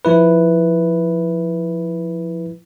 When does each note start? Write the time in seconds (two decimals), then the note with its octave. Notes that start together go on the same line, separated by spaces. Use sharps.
0.05 F3 E4 B4